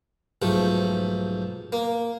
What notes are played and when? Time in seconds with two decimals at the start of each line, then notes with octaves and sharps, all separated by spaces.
0.42 B1 G#2 F3 A3
1.72 A#3